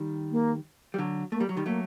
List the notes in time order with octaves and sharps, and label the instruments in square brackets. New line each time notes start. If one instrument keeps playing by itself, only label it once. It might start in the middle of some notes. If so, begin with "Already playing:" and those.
Already playing: [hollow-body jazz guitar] D#3 G3
[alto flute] A#3
[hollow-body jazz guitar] G3
D3 F#3
[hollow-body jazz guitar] A3 [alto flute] A#3
[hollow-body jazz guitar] G3
F#3
D#3 G3
[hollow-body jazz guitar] F#3 A3 [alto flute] A#3